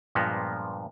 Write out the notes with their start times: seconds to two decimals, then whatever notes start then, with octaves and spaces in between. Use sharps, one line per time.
0.15 G2 A#2 F3 G#3 A#3 B3